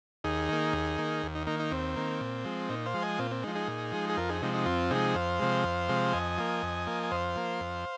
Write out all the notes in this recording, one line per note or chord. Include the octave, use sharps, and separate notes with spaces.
D#2 D#4 G#4
D#3 A#3
D#2
D#3 A#3
D#2
D#4
D#3 A#3 D#4
D#4
D#2 C4
D#3 A#3
A#2
F3 G#3
A#2 D#4
C5 F5
F3 G#3
D#5 G#5
A#2 C4 F4
C4
F3 G#3 D#4
D#4 G#4
A#2
F3 G#3
G#4
F2 F4 A#4
D#4 G#4
C3 F3 G#3 D#4
D#4
F2 C4 F4
C3 F3 G#3 D#4 G#4
F2 C5 F5
C3 F3 G#3
F2
C3 F3 G#3
F2 D#5 G#5
F3 A#3
F2
F3 A#3
G#5
F2 C5 F5
F3 A#3
F2